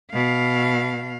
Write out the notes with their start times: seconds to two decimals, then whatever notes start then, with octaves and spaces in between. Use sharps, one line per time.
0.12 B2 F5